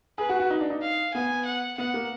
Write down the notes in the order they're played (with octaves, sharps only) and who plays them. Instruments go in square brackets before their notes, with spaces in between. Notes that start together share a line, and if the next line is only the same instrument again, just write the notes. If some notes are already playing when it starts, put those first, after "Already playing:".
[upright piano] G#4 [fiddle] B4
[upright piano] F#4
F#4
D#4
D4
D#4
[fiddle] F5
[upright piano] B3 [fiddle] G#5
[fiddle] F#5
[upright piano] B3 [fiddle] F#5
[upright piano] A#3